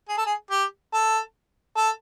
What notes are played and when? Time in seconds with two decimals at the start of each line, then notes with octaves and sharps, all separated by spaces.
0.09 G#4
0.18 A4
0.26 G#4
0.51 G4
0.94 A4
1.77 A4